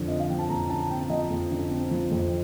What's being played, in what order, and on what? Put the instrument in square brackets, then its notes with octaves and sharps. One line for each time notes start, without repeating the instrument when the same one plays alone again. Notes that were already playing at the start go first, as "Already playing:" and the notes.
Already playing: [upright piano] F2 D3 F3
C4 D#5
F5
F3 G5
A5
F2 A#5
D3 A5
C4 G5
F3 D#5
F2
D3
C4
F3
F2